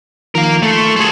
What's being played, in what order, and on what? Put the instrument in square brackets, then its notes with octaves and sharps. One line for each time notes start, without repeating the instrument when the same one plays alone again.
[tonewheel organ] D#3 F3 [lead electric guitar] A#4 F5
[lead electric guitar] A3 [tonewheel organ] C6 C#6
[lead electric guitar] G#4 A4